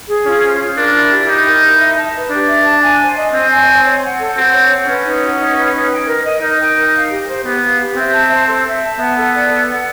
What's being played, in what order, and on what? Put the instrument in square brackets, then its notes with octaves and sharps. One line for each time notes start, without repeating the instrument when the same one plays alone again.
[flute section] G#4
[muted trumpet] C#4 [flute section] F4
[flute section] C5
F4
[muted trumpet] D4 [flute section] A#4
[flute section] E4
G4
[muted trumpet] D#4 [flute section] E4
[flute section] A#4
E4
E5
A5
B4
[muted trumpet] D4 [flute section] G4
[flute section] E5
A5
G#5
C5
D#5
[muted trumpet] C4 [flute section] C5
[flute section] G#5
C5
C#5
F#5
A4
[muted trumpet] C4 [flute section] F#4
[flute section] C#5
F#5
[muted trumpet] C#4 [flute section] B4
[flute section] D#4
F#4
D#4
B4
D#4
G5
A#4
D#5
[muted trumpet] D#4 [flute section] A#4
[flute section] G5
A#4
F5
G4
C5
[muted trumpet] B3 [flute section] G4
[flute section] F5
G4
[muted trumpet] C4 [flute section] E5
[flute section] A5
C5
A4
E5
A5
[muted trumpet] B3 [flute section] F#5
[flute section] A4
D5
A4
F#5